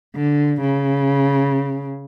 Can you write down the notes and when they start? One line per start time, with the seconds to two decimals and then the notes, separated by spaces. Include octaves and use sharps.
0.16 D3
0.61 C#3